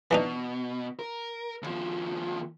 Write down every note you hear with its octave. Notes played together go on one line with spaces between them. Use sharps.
B2 E3 D4 D#4
A#4
D#2 F3